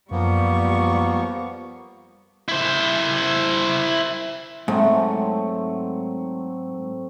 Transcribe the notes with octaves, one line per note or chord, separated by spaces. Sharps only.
F#2 F3 G3 A#3 B3 C#6
E4 C5
G#2 F#3 A3 C4